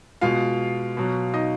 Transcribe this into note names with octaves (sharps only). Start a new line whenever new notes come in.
B2 G#3 F4 F5
B2 F#3
D#4 D#5